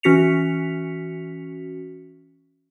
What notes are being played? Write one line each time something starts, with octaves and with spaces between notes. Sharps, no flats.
E3 C#4 F#4 B6 C#7 F7